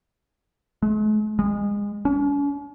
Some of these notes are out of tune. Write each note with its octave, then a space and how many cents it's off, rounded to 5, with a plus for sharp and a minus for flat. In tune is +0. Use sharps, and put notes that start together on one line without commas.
G#3 +45
G#3 -25
C#4 +45